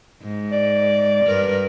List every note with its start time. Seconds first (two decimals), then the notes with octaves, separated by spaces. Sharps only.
0.22 G#2
0.52 D5
1.25 G2 A#4 B4